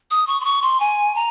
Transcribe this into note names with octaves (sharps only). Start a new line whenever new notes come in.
D#6
C#6
C6
C#6
C6
G#5
A#5